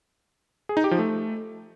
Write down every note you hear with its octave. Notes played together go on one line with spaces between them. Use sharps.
G#4
D#4
G4
F3
A3